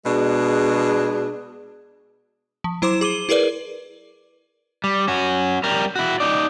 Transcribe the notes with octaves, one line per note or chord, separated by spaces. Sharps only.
B2 G#3 D4 G#4
F3
F#3 E4 C5 C6 D6 E7
G#4 D6 D#7 G7
E4 G#4 A#4 B4 D5
G3
C#4 F#4
G3 A#4
E4 F#4
D#4 D5